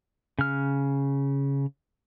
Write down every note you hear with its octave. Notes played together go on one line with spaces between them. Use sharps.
C#3 F6